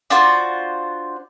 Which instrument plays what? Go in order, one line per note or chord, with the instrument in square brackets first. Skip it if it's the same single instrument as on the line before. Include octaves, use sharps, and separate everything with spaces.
[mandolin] D4 F4 F#4 C5